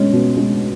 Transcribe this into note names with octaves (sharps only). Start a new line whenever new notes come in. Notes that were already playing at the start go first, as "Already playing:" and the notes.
Already playing: B2 G#3 C#4
B2
G#3 C#4